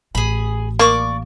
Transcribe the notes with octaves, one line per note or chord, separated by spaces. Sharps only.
A1 G#4 B5
A#3 D5 C#6 D6